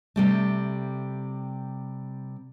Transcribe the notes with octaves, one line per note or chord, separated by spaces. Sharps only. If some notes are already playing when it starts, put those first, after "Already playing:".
C3 G3 A3